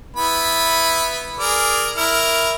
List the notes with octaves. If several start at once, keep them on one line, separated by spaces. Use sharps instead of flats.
B3 E4 B5
G#4 A#4 D5
E4 A#4